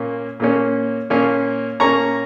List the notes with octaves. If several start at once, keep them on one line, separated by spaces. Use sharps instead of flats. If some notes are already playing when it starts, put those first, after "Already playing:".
Already playing: A#2 A#3 C#4
A#2 A#3 C#4
A#2 A#3 C#4
A#2 A#3 C#4 A#5 C#6